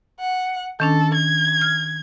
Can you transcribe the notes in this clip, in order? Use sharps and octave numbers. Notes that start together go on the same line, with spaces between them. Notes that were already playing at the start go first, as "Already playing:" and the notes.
F#5
D#3 C#4 D4 A4
G#6
F6